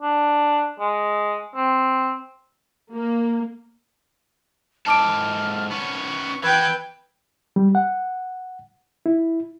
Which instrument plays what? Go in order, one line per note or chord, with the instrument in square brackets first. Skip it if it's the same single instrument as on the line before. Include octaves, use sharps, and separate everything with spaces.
[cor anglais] D4
G#3
C4
[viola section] A#3
[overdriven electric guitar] G#2 A4 [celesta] A5 D6 D7 [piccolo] F6
[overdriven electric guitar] B3 C#4 [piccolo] C#6
[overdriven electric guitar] E3 B3 [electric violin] B4 G5 [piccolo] G#6
[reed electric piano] G3
F#5
E4